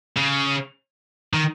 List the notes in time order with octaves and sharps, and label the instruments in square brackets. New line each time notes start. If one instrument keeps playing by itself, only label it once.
[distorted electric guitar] C#3
D#3